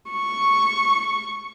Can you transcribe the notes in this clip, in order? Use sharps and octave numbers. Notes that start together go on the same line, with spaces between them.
C#6